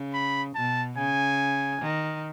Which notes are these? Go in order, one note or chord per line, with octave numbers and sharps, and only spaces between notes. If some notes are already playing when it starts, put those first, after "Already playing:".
Already playing: C#3
B5
B2 A5
C#3 G#5
D#3